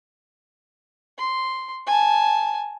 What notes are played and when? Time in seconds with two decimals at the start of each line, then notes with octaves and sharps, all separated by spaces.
1.18 C6
1.87 G#5 A5